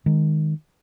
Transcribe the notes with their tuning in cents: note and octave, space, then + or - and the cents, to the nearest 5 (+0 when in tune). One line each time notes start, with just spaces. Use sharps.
D#3 +0 G#3 +0